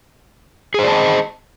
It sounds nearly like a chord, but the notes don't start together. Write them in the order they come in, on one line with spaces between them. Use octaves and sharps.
G#4 C5 D5 A5 D#5